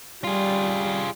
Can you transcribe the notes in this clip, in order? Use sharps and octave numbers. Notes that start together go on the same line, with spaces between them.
G3 F4 G#4